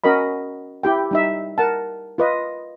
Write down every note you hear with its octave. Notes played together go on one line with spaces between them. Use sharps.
C#4 F#4 A#4 D#5 B5
E4 G4 G5
G3 D#4 E5
A#4 F#5 A5
F4 B4 D#5